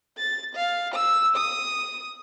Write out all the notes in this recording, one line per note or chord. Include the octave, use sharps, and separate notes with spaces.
A6
F5
E6
D#6